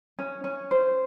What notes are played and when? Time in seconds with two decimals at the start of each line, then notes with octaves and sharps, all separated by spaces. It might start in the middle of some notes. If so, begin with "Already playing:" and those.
0.19 C#4
0.44 C#4
0.71 C5